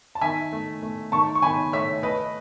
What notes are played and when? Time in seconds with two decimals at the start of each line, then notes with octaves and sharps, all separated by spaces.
0.15 A5
0.21 D#3 E5 G#5
0.53 A3
0.83 A3
1.12 D#3 A5 C#6
1.35 C#6
1.42 D#3 G#5 B5
1.73 A3 C#5 E5
2.02 A3 B4 D#5